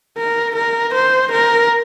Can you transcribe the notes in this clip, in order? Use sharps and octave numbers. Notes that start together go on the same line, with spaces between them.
A#4
A#4
C5
A#4